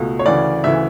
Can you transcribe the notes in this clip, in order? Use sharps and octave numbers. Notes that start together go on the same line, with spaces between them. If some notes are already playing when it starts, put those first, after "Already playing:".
Already playing: C#2 B2 A3
C#5
D2 C#3 E3 D5
D2 C#3 E3 E5